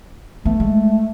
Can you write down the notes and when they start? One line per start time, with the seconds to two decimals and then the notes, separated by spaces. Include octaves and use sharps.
0.45 A3 B3
0.60 G#3